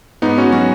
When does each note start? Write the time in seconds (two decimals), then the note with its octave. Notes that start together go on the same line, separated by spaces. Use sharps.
0.22 G#2 B3 D#4
0.38 C#4 F#4
0.52 F#3 C#4 F#4